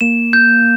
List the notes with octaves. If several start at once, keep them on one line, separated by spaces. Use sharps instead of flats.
A#3 E7
G6